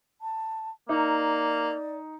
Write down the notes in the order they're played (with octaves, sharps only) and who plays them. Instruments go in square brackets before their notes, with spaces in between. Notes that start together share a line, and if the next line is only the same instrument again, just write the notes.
[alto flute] A5
[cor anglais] A#3 [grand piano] D#4 [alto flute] D5